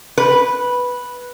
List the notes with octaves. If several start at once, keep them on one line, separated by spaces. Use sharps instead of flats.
B4